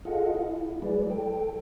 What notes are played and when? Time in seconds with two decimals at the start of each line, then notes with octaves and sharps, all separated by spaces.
0.05 F4 G#4 A4 D#5 F5 F#5
0.35 E4
0.82 F#3 G#3 G#4 B4 D5
1.10 A4 G5